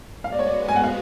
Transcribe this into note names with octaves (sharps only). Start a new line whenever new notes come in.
G#3 B3 F#4 F5
D5
C#5
D5
G#5
F#5
F5